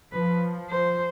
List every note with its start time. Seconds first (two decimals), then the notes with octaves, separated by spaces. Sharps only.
0.12 F3 B4
0.70 C5